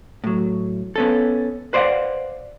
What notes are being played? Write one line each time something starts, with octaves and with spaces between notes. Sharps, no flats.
A2 F#3
B3 C#4 A4
B4 C5 D5 D#5 F5 F#5